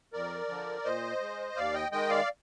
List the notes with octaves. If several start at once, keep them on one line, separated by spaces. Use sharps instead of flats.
F2 A#4 D5
D3 F3
A#2 C5 D#5
G#3
D#2 D5 F5
D#5 G5
D#3 G#3 D#5 G5
D5 F5